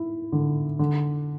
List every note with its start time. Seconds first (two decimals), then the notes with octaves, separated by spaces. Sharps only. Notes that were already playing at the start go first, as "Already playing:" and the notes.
Already playing: E4
0.32 D3
0.79 D3